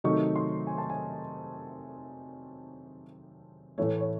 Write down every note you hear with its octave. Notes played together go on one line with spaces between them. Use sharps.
C3 D#3 F#3 A3 D#4 C#6
C6
G#5
A5
G#5
A2 E3 A3 C#5
C#5